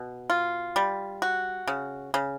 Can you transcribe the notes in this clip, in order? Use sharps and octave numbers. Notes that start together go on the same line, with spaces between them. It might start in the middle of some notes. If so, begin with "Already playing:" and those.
Already playing: B2
F4
G3
F#4
C#3
C#3